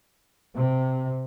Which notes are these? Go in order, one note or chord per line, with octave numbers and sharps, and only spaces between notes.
C3